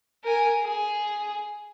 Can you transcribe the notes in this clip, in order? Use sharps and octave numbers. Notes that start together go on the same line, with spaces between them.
A#4 G#5
G#4